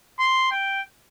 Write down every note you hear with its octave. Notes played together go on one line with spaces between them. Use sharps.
C6
G5